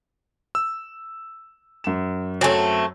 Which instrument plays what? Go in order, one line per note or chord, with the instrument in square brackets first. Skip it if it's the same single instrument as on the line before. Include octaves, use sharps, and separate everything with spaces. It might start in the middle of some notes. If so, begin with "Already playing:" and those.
[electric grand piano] E6
[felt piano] F#2 E7
[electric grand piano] F#3 [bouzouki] A3 C4 [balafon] C#5 G#5